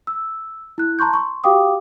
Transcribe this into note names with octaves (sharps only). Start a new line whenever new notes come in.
E6
E4 F#6
A5 A#5 C6 C#6 G6
C6 C#6
F#4 G4 F5 G5 D6 D#6